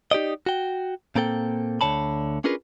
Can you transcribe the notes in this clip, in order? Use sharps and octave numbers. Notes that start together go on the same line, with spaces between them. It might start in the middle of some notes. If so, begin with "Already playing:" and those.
D#4 G4 D5 D#5
F#4 G5
A#2 A#3 C4 A4 G5
D2 G#2 D3 C#5 A5 B5
C#4 D4 F4 G#4 A#4 B4